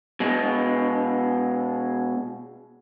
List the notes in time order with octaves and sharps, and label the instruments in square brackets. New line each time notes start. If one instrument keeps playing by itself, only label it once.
[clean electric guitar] B2 G#3